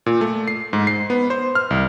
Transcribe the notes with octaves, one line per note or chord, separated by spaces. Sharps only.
A#2
A3
C7
G#2
C7
B3
C5
F6
C2